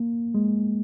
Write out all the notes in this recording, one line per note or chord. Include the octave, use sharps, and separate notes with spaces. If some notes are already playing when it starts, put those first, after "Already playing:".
Already playing: A#3
G#3